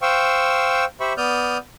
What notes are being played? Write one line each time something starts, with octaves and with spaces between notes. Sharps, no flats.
C5 F5 G5 C#6 E6
G4 C5 E5 B5 C#6
B3 D5 D#6 F6 G6